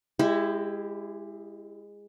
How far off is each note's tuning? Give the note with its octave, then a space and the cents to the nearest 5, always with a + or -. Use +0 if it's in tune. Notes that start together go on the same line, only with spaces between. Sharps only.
G#3 -20 E4 +15 G4 +10